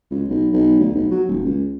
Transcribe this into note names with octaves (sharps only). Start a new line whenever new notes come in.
C#2
B1
B1
D2
B1
F#3
D#1
C#2